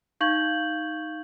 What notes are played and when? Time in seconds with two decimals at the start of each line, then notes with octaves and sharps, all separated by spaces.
0.21 D#4 F5 C#6 G6 G#6 F#7